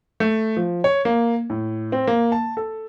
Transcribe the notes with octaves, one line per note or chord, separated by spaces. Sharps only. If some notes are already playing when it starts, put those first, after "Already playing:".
A3
F3
C#5
A#3
A2
C4
A#3
A5
A4